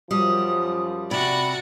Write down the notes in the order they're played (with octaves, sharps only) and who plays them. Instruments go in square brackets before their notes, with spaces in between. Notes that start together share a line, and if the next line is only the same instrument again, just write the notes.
[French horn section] F#2 F3 [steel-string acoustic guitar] G3 [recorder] D#6
[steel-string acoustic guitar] C3 [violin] F#4 D5 [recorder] B5